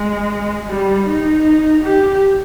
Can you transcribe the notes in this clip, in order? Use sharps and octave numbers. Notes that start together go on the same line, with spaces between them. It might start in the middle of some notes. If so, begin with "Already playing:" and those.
Already playing: G#3
G3
D#4
G4